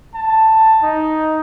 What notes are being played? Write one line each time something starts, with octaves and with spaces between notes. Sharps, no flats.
A5
D#4